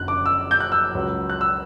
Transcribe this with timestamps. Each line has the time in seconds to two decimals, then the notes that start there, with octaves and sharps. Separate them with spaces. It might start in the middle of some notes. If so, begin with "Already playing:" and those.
Already playing: F#1 F#2 D3 F#3 F#6
0.08 D6
0.26 E6
0.51 G6
0.60 F#6
0.72 E6
0.95 C#2 C#3 F#3
1.30 F#6
1.41 E6